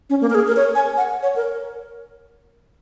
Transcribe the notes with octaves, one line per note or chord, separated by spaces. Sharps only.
C#4
A#3
A#4
G#4
A#4
C#5
G#5
F#5
C#5
A#4